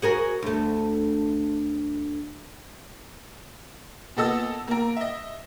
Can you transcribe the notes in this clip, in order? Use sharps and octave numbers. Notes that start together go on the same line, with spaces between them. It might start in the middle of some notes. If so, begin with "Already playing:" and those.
F#4 G#4 A#4
D2 A3
A#2 B3 A4 D#5 E6 A6
A#3 A#4
D#5 E5